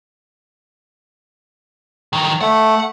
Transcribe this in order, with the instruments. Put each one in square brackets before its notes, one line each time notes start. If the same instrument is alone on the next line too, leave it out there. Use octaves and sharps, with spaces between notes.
[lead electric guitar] D#3 F#3
[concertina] A3 [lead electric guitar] F#5